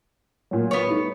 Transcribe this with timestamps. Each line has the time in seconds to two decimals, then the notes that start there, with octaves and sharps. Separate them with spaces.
0.51 A#2 F#3
0.71 B3 C#5
0.86 G3 A3 D#4